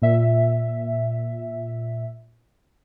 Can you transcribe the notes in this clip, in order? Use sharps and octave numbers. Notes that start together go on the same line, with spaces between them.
A#2 E5